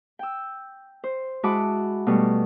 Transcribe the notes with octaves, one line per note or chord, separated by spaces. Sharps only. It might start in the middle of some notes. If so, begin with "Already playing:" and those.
G5 E6
C5
G#3 E4 F#4 A5 B5 D6
B2 G3 A3